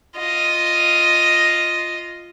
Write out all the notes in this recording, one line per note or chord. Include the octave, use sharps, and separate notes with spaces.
F4 D#5